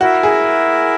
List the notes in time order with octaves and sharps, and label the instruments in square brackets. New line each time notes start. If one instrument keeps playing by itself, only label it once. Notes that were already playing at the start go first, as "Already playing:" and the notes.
[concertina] E4 A#4 E5 [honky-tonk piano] F#4
[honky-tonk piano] G#4